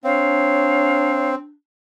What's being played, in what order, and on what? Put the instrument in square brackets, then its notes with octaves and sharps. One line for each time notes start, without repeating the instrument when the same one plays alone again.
[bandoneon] C4 [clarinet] D4 [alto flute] C#5 [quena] F5